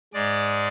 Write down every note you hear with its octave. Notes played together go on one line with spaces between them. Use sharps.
G#2 G#3 D5